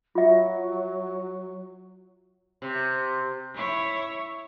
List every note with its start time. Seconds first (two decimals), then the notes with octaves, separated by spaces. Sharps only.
0.15 F#3 F4 E5
2.62 C3
3.55 E4 C#5